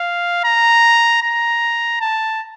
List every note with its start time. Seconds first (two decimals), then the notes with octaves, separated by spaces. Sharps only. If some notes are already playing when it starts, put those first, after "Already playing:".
Already playing: F5
0.44 A#5
1.22 A#5
2.01 A5